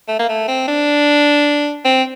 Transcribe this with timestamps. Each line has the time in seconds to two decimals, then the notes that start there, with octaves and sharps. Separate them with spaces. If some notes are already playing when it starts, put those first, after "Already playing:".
0.08 A3
0.19 A#3
0.29 A3
0.48 C4
0.68 D4
1.85 C4